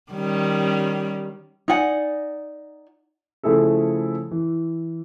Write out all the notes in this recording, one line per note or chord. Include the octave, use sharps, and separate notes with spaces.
D#3 G3 C#4
D#4 D5 F#5 G#5
C#3 F3 A3 E4 G#4 A4
E3